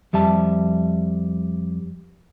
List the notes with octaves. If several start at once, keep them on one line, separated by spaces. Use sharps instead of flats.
F2 G3 E5 A5